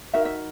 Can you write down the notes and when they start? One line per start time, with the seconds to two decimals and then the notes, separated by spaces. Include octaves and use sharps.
0.13 D#4 F#4 A#4 E5
0.25 E5